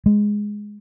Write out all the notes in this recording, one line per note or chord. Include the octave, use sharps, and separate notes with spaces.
G#3